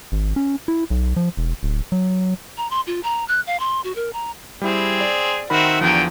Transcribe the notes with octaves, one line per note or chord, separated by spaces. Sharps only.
G#1
C#4
E4
B1
F3
E1
D1
F#3
A#5
C6
F4
A#5
F#6
F5
C6
F#4
A#4
A#5
G3 C4 E4 G#4
D5
D#3 C4 F#4 A#4 E5 B5
E2 D3 F3 F#3 G5